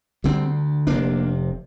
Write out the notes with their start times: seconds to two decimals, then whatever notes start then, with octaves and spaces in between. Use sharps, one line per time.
0.24 D2 D3 G3 C4
0.87 F1 C3 A#3 D4